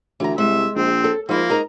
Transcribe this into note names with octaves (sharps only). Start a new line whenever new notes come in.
D2 E3 A#5
C2 G#3 E5
A#1 C4
A4
G#2 F3 A#3 E4
G#2 A#4 D#5 A#5